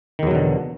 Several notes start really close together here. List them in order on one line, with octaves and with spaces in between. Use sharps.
D#3 E2 F#3 B2 D3